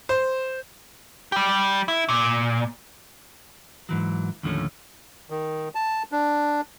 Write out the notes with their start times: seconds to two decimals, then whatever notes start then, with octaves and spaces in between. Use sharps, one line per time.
0.09 C5
1.32 G3 G4
1.88 E4
2.09 A#2
3.89 G#2 E3 F#3
4.43 D#2 A2 D3 F3 A3 C#4
5.30 D#3
5.75 A5
6.12 D4